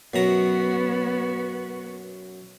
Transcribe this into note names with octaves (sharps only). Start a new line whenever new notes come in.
F#2 B2 B3 F#4 A#5